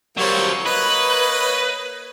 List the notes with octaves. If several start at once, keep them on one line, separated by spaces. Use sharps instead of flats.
F#3 G3 A#3 C5 C#5
A#3 B4 D#5 B5